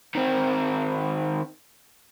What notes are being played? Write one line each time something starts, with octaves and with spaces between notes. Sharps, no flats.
D#3 C4